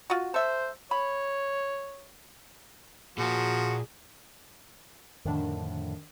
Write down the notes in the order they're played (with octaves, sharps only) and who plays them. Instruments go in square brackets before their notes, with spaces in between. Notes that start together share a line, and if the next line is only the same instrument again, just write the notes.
[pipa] F4 F#4
[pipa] A4 E5 [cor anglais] C5
[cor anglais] C#5 [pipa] B5
[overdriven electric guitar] A#2 [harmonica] F3 [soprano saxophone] F#4 [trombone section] G#4
[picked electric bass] F2 A2 D3 [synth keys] D#3 D4